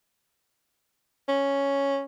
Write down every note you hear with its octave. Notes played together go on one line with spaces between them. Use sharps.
C#4